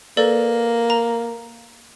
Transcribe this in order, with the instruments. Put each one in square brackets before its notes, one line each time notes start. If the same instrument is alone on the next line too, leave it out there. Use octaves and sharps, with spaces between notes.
[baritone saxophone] A#3 [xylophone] A4 B4 D5
[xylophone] A#5